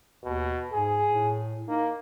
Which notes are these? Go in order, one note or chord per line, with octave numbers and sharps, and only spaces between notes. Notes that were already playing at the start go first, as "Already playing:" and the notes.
D#2 B2
G#2 G#4
A2
A#3 D#4